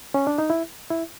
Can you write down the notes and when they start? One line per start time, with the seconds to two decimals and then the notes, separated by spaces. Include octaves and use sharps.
0.14 C#4
0.27 D4
0.38 D#4
0.50 E4
0.90 E4